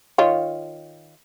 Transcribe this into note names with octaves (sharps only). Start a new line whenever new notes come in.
D#3 F4 C#5